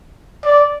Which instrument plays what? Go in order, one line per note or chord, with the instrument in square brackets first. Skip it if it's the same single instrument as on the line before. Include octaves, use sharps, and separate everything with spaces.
[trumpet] D5